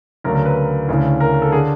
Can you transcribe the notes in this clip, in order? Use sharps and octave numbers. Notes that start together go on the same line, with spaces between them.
D2 C#3 F#3 A#4
A#4
B4
D2 C#3 E3
A#4
A4
D3 G#4